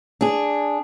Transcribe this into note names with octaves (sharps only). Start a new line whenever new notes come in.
D4 G#4